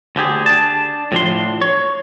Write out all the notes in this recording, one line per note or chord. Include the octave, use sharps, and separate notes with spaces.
D2 D3 G4 G#4
D4 A5
A2 F3 D4 C6
C#5